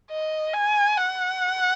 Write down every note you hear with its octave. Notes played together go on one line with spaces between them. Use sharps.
D#5
G#5
F#5